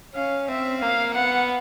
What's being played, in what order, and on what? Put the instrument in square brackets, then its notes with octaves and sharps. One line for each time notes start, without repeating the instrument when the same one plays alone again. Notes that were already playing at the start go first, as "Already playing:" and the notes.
[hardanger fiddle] C#4 [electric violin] F5
[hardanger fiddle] C4 [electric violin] E5
[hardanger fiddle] A#3 [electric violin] F5
[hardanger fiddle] B3 [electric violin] F#5